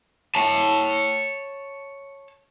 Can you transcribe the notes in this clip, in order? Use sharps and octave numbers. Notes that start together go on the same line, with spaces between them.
C#5 A5